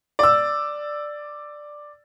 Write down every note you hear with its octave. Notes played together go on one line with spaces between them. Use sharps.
D5 E6